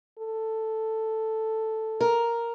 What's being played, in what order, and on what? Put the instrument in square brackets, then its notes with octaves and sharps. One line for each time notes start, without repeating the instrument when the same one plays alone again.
[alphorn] A4
[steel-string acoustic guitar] A#4